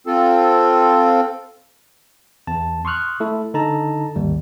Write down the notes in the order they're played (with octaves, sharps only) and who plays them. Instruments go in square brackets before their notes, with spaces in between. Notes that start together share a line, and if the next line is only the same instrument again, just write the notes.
[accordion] C4 F4 A4
[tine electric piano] E2 A5
C6 C#6 D#6 F6 F#6
A3 E4 A4
D3 D#4 A4 A5 A#5
G#1 D#2 G3